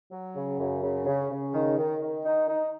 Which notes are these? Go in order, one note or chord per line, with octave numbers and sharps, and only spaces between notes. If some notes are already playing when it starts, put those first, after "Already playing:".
F#3
C#3
F#2
C#3
C#3
C#3
D#3
D#3
D#3
D#4
D#4